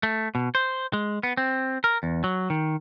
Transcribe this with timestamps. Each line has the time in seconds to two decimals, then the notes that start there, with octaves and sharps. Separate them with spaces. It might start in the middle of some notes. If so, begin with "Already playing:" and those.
0.03 A3
0.35 B2
0.55 C5
0.93 G#3
1.23 B3
1.37 C4
1.84 A#4
2.03 E2
2.24 F#3
2.50 D#3